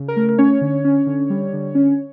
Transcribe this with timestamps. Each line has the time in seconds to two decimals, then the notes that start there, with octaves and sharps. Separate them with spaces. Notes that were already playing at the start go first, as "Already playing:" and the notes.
Already playing: C#3
0.08 A#4
0.16 A3
0.29 A#4
0.38 C#4 C#5
0.61 D3
0.84 C#4
1.07 D3
1.30 G3
1.53 D3
1.75 C#4